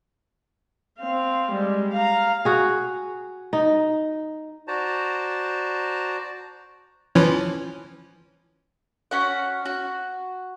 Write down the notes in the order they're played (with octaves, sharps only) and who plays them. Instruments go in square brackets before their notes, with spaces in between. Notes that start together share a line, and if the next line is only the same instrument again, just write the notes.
[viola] C4 F5
G3 G#3
F5 A#5
[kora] F#4 G#4
D#4
[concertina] F#4 C5 D5 A5 A#5
[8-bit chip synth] E3 F3 C#4
[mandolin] C#4 F#4 F#5
F#4